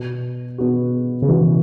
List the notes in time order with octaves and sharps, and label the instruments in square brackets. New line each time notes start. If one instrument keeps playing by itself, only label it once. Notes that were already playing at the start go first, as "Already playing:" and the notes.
Already playing: [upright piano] B2 B3 F#4
B2 B3 F#4
[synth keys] C#3
[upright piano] B2 B3 F#4 [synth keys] E3